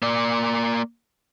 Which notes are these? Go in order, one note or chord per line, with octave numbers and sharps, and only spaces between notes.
A#3 D5